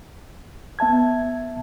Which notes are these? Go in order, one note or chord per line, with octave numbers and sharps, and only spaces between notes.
B3 E5 A5 G#6